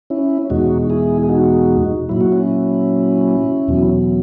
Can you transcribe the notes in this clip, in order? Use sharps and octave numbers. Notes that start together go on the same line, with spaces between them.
C#4 E4
E2 B2 G#3 D#4 F#4
E4 G#4
G#4
D#4 F#4
A#2 F#3 E4
F#4
C#4 E4
E2 B2 F#3